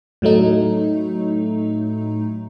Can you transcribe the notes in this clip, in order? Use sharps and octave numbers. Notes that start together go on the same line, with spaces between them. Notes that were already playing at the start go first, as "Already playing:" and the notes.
A2 F#3 A3 D#4